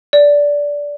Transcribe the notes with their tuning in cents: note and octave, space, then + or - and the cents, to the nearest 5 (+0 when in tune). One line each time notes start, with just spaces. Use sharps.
D5 -15